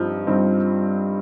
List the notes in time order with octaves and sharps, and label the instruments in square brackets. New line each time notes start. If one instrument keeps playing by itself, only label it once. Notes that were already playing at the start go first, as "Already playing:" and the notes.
Already playing: [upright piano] G2 G3 C4 D#4 [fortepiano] F3
[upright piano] G2 G3 C4 D#4